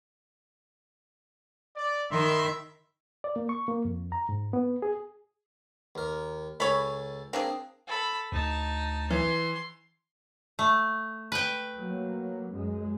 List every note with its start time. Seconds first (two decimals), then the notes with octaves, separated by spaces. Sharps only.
1.75 D5
2.11 D#3 E5 B5 C6
3.24 D5
3.36 A#3
3.49 C#6
3.68 A#3
3.85 F2
4.12 A#5
4.29 G#2
4.53 B3
4.82 G#4
5.95 D#2 A#4
6.60 C#2 A4 C#5 G#5 B5
7.33 A#3 C4 D4 G#4
7.87 A4 B5
8.32 D2 D#4 A5
9.10 E3 C6
10.59 A3
11.32 B4 G5
11.76 F#3 A#3
12.53 F#2 G#3